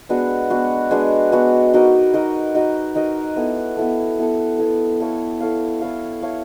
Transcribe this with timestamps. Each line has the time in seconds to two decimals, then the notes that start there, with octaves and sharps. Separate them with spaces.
0.09 G#3 B3 D4 F#4
0.50 G#3 B3 D4 F#4
0.91 G#3 B3 D4 F#4
1.32 G#3 B3 D4 F#4
1.73 D#4 F#4 A#4 D#5
2.14 D#4 F#4 A#4 D#5
2.55 D#4 F#4 A#4 D#5
2.95 D#4 F#4 A#4 D#5
3.36 B3 E4 A4
3.77 B3 E4 A4
4.19 B3 E4 A4
4.58 B3 E4 A4
5.00 E4 A4 C#5 F5
5.41 E4 A4 C#5 F5
5.81 E4 A4 C#5 F5
6.22 E4 A4 C#5 F5